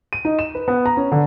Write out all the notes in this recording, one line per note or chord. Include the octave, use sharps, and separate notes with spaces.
D#7
D#4
E7
B4
B3
A#5
C#4
D3